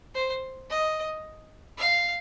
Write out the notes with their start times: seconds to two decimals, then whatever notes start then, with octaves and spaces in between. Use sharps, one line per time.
0.15 C5
0.70 D#5
1.78 F5